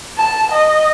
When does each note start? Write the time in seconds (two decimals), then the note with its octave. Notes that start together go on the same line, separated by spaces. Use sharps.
0.18 A5
0.52 D#5